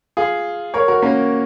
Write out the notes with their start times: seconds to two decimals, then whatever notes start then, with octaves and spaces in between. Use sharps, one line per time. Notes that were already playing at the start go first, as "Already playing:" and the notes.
0.17 F4 G#4
0.74 A#4 C#5
0.88 F#4 A#4
1.02 A#3 C#4